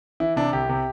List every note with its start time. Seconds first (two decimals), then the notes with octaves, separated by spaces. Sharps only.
0.20 E3 E4
0.36 C3 D4
0.53 C2 G4
0.69 C3